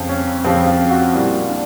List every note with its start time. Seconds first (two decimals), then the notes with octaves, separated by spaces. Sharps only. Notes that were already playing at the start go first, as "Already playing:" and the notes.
Already playing: F2 C#3 F3 C4
0.09 C#4
0.44 F2 C#3 F3 C4
0.67 F4
0.90 F#4
1.13 A#2 G3 A#3 E4
1.49 D4